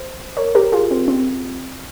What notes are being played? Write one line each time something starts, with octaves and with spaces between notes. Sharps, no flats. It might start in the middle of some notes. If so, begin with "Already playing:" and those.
Already playing: C5
A#4 C#5
G4 A#4
F4 G#4
C4
C4